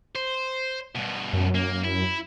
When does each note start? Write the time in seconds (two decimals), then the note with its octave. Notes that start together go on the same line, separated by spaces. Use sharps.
0.16 C5
0.95 G2 B2
1.33 F#2
1.55 A#3
1.84 E4